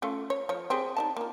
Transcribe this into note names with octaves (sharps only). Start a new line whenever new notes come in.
A3 C#4 F4
C#5
F3 C#5
C4 G4 G#4
D#4 D5 A5
A#3 F4